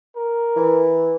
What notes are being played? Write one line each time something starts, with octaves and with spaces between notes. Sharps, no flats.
A#4
E3